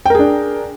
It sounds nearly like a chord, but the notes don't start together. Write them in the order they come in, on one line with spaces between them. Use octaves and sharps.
G5 A#4 G#4 D4